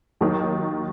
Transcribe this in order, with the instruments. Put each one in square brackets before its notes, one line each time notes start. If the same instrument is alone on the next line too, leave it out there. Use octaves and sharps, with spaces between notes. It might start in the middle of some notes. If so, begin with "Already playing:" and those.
[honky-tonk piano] D#2 D#3 F#3